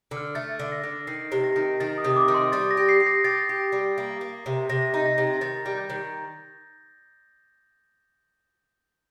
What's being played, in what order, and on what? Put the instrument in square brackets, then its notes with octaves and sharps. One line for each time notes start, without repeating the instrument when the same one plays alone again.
[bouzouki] D3
[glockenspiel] F6
[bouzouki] A3 [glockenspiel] A6
[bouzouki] D3
[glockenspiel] A#6
[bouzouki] D3
[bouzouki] D#3 [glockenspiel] C7
[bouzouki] C3
[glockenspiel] A#6
[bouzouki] D#3
[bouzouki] D#3 [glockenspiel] A6
[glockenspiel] D#6
[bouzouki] C3
[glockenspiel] D#6
D6
[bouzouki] D#3
[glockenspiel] C6
[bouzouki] G3 [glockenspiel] A6
[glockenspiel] A#6
[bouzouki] G4
[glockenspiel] C7
[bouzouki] G4
[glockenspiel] A#6
[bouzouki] G4 [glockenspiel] A6
[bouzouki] G4
G3
A#3
A#3
C3
[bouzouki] C3 [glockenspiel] A#6
[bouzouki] D#4
[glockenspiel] A#6
[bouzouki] C3
[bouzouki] D#3 [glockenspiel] A6
[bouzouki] G3
[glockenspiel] G6
[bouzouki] D#3